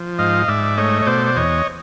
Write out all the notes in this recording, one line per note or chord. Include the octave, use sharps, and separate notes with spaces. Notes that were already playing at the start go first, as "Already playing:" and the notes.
Already playing: F3
G#2 D#5 F5
G#2 D5 E5
A3 C#5 D#5
C#5
B2 C5 D5
D5
E2 C#5 D#5